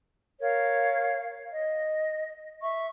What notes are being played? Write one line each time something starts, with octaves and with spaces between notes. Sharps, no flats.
A#4 C#5 F5
D#5
E5 C#6